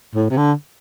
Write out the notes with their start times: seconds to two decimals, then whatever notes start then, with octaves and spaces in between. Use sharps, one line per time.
0.15 A2
0.30 C3
0.37 D3